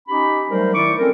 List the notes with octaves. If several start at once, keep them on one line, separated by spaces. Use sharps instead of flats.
C#4 D#4 G4 B5
F#3 G3 A3 D#4 A#4 C5
D#3 E4 D5 C#6 D6
C4 C#4 A4 A#4